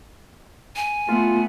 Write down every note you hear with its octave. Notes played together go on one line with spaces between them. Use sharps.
G#5
A3 B3 F4